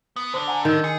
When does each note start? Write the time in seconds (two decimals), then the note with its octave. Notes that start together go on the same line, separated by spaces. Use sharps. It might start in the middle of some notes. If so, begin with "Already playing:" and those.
0.16 B3
0.34 D3 D4 C5
0.48 F#5 G#5 A#5
0.65 D#3 A#4 E6
0.84 G#4 C#7